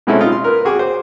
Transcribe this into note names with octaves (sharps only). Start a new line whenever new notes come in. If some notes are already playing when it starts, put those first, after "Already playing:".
B2 G#3 C4 C#4 E4 A4
D#4 F4 D#5
C6
A#4 B4
F#4 G#4 G5 D6
C5